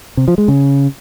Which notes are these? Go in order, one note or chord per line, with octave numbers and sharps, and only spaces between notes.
C3
F3
G#3
C#3